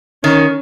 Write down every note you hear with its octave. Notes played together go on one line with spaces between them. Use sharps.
D#3 C#4